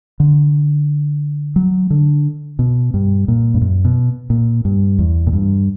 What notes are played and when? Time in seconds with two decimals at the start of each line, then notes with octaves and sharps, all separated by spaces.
0.20 D3
1.56 F#3
1.90 D3
2.59 B2
2.94 G2
3.28 A#2
3.54 G2
3.61 F#2
3.85 B2
4.30 A#2
4.65 G2
4.99 E2
5.27 A#2
5.33 G2